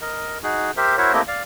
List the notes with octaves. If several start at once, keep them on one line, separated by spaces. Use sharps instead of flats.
A#4 D#5
D#4 F#4 G#4
G4 A#4 C5 E5
E4 F#4 A#4 C5 C#5 E5
A3 A#3 C4 E4 G4 D#5
D5 F5